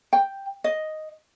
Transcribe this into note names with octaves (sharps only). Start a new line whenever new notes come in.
G5
D#5